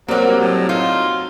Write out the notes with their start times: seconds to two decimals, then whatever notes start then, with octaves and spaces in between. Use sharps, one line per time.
0.08 F#3 G3 A#3 C4 A#4 F#5
0.41 A2 F#3
0.69 D#4 F4